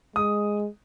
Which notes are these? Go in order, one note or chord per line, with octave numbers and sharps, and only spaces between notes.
G#3 D#6